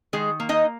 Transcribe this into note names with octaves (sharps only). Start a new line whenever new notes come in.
D#3 G#3 G#4
A#3
D#4 D#5